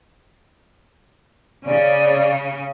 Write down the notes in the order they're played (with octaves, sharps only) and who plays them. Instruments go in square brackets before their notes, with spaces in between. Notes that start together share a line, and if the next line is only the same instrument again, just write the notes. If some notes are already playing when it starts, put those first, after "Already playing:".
[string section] C#3 [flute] D5